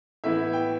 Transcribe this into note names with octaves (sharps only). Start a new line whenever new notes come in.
A2 E3 B3 E4 E5
G5